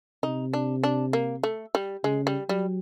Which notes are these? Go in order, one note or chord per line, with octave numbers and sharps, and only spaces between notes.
C3 D#4
D4
D4
A#3
A3
G3
C#3 G#3
G3
F#3 G3